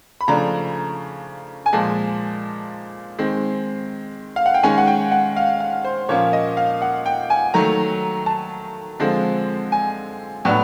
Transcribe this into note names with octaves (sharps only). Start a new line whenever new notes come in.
B5
C#3 F3 A3 D4 A#5
G#5
A#2 F3 G#3 A5
D#3 G#3 C4
F5
F#5
G5
D#3 G#3 C#4 G#5
F#5
G5
F#5
F5
F5
C5
A#2 F3 A#3 C#4 C#5
D#5
F5
F#5
G5
G#5
D#3 F#3 A3 A#5
A5
D3 F3 G#3 C4
G#5
A2 F#3 B3 D4